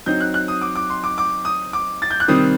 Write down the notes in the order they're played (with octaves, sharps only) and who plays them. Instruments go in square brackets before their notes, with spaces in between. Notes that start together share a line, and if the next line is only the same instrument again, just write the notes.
[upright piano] F#3 C4 D#4 G6
F#6
F#6
D#6
D6
D6
C6
D6
D6
D#6
D6
A6
G6
F#6
C3 D#3 G3 C4 D#6